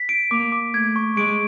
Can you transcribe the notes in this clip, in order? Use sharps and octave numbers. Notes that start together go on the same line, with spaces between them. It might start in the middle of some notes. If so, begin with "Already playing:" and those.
Already playing: B6
D7
A#3 D6
D6
A3 G#6
C#6
G#3 D7